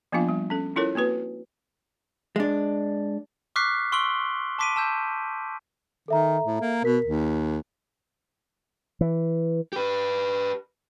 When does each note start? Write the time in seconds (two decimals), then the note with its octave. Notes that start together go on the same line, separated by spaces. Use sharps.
0.12 F3 A#3 B3 D4 F4 F5
0.29 G3
0.50 C#4 A4
0.76 C#4 E4 F4 A4 A#4 C#5
0.95 A#3 C4 F#4 B4
2.36 G#3 D4
3.56 C#6 D6 F6 F#6 B6 C7
3.92 C6 C#6 E6 D7 F#7 G7
4.59 A5 C6 D6 B6 D7 D#7
4.76 A5 E6 G6
6.08 D#3 A4 E5 A#5
6.45 A2
6.61 A#3
6.84 B2 A#4 B6
7.05 D#2
9.01 E3
9.73 G4 B4